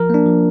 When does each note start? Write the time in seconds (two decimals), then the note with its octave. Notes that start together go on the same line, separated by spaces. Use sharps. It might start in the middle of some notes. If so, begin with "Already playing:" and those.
Already playing: F3 A#4
0.10 A#3 D4
0.26 F3